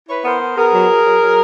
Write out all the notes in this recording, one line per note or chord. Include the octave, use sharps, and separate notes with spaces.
E4 B4 C#5
B3 A#4 C5
B3
B3 G#4 A#4
F#3
F#3
F#3
F#3